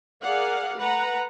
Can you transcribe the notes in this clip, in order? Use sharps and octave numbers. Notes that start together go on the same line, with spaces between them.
G#4 A#4 D5 F5 F#5
A3 B4 F#5 A#5